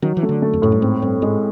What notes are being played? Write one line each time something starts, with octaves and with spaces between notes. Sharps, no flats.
D#3 F#3
E3
A3
D3
A3
F2
F#2 A2
G2
G#2 C4
G2 C4
G#2 G#3